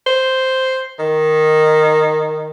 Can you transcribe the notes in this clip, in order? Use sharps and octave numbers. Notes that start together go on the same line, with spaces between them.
C5
D#3